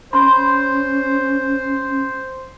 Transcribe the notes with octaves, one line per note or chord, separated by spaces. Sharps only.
C#4 C5 B5 C6